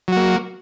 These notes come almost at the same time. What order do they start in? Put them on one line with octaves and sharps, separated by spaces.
F#3 F#4 A#3